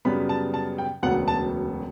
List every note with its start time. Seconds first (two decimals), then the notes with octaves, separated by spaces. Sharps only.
0.05 F#2 C#3 G3 B3 B5
0.29 A5
0.54 A5
0.78 G5
1.02 E1 D2 C#3 F#3 B3 F#5
1.28 A5